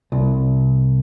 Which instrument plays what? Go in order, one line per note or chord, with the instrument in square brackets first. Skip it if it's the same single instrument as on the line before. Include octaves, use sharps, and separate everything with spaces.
[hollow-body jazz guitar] C2